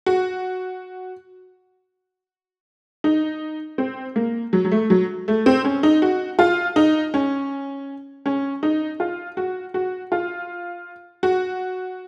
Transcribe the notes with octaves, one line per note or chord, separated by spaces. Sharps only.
F#4
D#4
C4
A#3
F#3
F#3
A3
F#3
A3
C4
C#4
D#4
F#4
F4
D#4
C#4
C#4
D#4
F4
F#4
F#4
F4
F#4